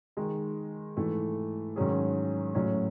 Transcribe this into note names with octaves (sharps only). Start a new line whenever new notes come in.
D#3 G#3 D#4
G#2 E3 A3
G#2 D#3 F#3 C#4 G#4
A2 F#3 C#4